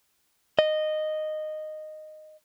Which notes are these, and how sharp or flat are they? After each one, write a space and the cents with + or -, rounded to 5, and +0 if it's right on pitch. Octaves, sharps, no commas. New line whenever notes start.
D#5 -10